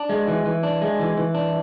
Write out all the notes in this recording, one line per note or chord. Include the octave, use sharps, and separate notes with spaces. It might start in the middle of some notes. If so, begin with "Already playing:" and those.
Already playing: D4
G#3
E3
E3
D4
G#3
E3
E3
D4